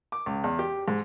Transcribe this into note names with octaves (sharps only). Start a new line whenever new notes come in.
D6
C#2
E2
G4
G#2